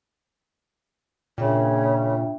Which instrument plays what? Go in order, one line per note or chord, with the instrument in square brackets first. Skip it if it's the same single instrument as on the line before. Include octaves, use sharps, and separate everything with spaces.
[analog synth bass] A#2 [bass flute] C#3 [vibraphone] D4 E5 G5